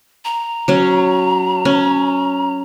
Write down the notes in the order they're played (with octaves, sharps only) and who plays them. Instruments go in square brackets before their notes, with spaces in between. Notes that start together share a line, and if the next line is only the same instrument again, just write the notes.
[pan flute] A#5
[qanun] F#3 C#4
C#4